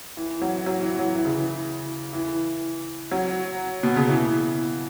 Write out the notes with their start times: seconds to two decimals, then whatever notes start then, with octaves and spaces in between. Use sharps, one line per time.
0.17 E3
0.42 F#3
0.66 F#3
0.82 E3
0.99 F#3
1.15 E3
1.25 C#3
1.35 E3
2.13 E3
3.11 F#3
3.83 B2
3.96 C#3
4.09 E3